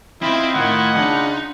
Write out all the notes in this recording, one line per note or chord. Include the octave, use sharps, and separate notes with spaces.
C4 E4 F4 D#5 B5 C6
A2 D#3 F#5
C#3 D4 D#4